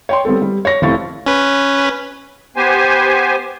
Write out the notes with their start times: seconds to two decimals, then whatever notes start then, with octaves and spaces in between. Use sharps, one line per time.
0.09 C#5 G5 C6
0.25 G3 B3 C4 A4
0.42 G3
0.65 C#5 A#6
0.82 F1 C4 E4 F5 C#6 A6
1.26 C#4 B4
2.56 B3 G4 C5 G#5